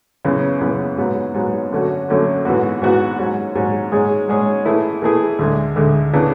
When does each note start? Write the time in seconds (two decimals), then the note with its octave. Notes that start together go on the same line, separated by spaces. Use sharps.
0.25 F#2 C#3 E3 B3
0.61 F#2 C#3 E3 B3
0.97 G#2 F#3 B3
1.34 G#2 F#3 B3
1.72 F#2 D3 A3 C#4 F#4
2.08 F#2 D3 A3 C#4 F#4
2.45 G#2 E3 B3 F#4
2.82 G#2 E3 B3 F#4
3.18 G#2 F#3 C#4
3.55 G#2 F#3 C#4
3.92 G#2 G#3 C#4 G#4
4.29 G#2 G#3 C#4 G#4
4.65 E3 A3 E4 G#4
5.02 E3 A3 E4 G#4
5.39 D2 D3 G#3
5.76 D2 D3 G#3
6.13 C#3 E3 B3 D4